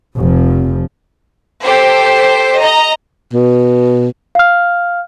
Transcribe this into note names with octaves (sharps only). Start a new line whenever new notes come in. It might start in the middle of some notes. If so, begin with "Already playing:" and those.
F1 F3
G4 A4 C5
D#5 A#5
B2
F5 F6